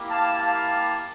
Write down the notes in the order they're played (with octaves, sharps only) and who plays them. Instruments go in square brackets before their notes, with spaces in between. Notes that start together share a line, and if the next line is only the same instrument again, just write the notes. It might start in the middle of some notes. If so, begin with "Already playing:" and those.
Already playing: [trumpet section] A#3 E4 G4
F5 A5
F5 A5